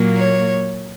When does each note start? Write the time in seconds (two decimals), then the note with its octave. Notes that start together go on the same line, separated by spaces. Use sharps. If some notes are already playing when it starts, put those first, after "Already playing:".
Already playing: A#2 F#3 A#3
0.16 C#5